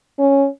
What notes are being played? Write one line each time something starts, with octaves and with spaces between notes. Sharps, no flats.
C#4